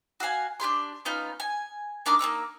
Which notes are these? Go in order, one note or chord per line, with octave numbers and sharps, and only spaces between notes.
F#4 E5 F5 G#5
D4 G4 G#4 C6
B3 C#4 D#4 F4
G#5
A#3 D4 D#4 D6
A#3 C#4 D#4 E6